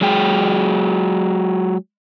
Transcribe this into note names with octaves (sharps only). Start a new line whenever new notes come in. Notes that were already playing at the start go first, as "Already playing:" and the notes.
F#3 G#3 G#4 G5